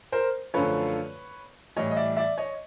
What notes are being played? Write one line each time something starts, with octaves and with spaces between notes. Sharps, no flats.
A#4 C5
F#2 D3 F3 A3 B4 C#5
A2 E3 G3 C#5 D#5
D#5
D5 E5
D5 E5
C#5 D#5